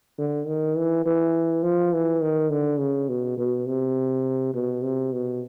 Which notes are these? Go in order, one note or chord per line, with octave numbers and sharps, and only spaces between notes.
D3
D#3
E3
E3
F3
E3
D#3
D3
C#3
B2
B2
C3
B2
C3
B2